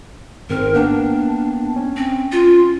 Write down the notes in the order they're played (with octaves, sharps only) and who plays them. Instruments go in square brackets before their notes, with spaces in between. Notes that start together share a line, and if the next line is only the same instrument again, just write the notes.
[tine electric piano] G#1 C4 F6 [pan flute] A#4
[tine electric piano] A#3 B3 G5 [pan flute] D4
[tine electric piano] C#4
[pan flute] C4
F4